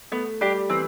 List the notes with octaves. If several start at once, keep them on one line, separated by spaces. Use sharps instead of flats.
A3 B3
G3 D4 G4
E3 C4